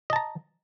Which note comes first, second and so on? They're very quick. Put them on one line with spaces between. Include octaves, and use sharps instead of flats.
D#5 A5 A#5